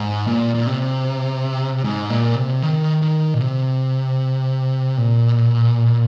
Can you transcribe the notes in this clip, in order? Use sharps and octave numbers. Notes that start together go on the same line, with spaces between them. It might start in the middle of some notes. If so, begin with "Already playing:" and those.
Already playing: G#2
A#2
A#2
C3
G#2
A#2
C3
D#3
D#3
A#2
C3
A#2